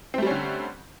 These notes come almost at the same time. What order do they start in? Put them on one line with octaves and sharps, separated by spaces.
C4 A3 G3 C#4 D3